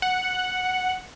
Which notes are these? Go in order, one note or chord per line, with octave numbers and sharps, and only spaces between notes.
F#5